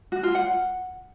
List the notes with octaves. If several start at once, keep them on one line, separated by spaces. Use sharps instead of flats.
F#4
F4
F#5